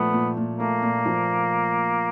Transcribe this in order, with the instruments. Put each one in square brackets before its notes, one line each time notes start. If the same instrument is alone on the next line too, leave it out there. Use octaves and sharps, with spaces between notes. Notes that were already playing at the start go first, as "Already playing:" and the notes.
Already playing: [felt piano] A#2 F3 A3 [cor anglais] B3
[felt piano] A#2
A#2
[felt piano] A3 [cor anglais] A#3
[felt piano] A#2
F3